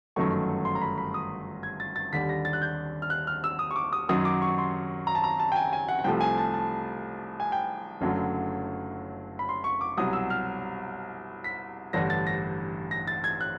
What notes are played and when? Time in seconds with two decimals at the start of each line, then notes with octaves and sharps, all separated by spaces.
0.16 G1 F#2 D#3 F#3 A3 C#6
0.65 C6
0.75 A#5
0.82 B5
0.98 B5
1.14 D#6
1.63 G#6
1.80 A6
1.96 A6
2.13 D#2 D3 G3 B6
2.29 A#6
2.45 A6
2.53 F#6
2.62 G6
3.02 F6
3.10 F#6
3.27 F6
3.44 E6
3.59 D#6
3.71 C#6
3.76 D6
3.93 D#6
4.09 F#2 D#3 F#3 D#6
4.25 D6
4.42 C#6
4.58 C6
5.07 A#5
5.15 A5
5.24 A#5
5.39 A5
5.52 G5
5.56 G#5
5.73 G#5
5.89 F#5
5.99 F#5
6.04 C2 C3 F3 A3 G5
6.21 G#5
6.38 A5
6.54 A5
7.40 G#5
7.52 G5
8.01 F#1 F#2 D3 F#3 A3
9.39 B5
9.49 C6
9.64 C#6
9.81 D6
9.97 C2 B2 F#3 D#6
10.13 E6
10.30 F6
11.44 B6
11.93 A1 G2 D3 A#6
12.10 A6
12.27 A#6
12.91 A#6
13.07 A6
13.24 G#6
13.41 F#6